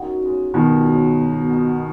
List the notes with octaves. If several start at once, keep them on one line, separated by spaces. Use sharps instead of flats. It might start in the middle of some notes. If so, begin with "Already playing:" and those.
Already playing: F#2 D#4 F#4
C#3 G#3
F#2 B2 D#3
C#3 G#3
B2
B3 D#4